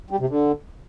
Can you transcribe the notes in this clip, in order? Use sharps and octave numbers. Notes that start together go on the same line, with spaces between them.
G3
C3
D3